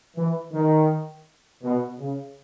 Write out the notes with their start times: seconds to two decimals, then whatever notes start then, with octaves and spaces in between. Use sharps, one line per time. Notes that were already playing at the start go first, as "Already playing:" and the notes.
0.16 E3
0.53 D#3
1.62 B2
1.99 C#3